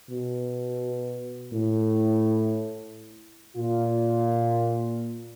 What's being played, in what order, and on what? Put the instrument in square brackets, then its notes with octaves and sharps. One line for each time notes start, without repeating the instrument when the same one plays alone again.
[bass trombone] B2
A2
[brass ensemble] A#2 F4